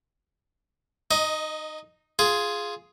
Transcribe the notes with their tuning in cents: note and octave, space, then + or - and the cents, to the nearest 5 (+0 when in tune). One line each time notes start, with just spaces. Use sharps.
D#4 -15 D#5 +10
F4 +0 G#4 +5